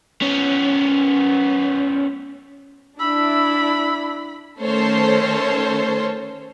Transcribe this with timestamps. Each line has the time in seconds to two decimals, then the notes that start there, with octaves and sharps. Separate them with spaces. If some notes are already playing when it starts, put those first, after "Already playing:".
0.22 B3 C#4
2.99 D4 E4 B5 E6
4.61 D#3 A3 C#4 A4 C5 C#5